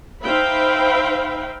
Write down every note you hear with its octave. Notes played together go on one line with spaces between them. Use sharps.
D#4 C5 E5 F5 G5 B5